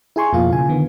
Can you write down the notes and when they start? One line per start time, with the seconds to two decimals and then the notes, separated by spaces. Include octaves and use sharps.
0.16 E4 G#4 G#5 C6 C#6
0.33 F2 B2 A#3 F4 F5
0.52 C#3 F4 G#5
0.69 D3 D#3 B3